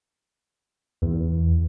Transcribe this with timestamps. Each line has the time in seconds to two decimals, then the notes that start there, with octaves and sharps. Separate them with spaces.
1.02 E2